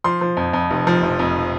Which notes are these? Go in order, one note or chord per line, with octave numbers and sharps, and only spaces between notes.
F3 C6
F3
F2
F2
F1
F3
F1
F2